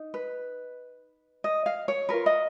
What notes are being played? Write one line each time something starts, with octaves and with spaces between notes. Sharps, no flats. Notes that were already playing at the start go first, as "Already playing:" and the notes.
Already playing: D#4
B4
D#5
F5
C#5
F4 A#4 B4
D#5